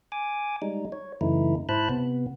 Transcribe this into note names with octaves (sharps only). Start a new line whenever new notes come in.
G#5 D6
G3 G#3 D#4
C#5
F#2 C#3 E3 A3 D#4 E4
G#2 E4 C5 A5 B5 F#6
C3 B3